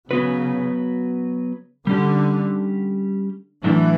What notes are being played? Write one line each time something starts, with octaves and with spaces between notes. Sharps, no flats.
C#3 F#3 B3 F#4 B4
D3 G3 C#4 G4
A2 E3 F#3 A3 D4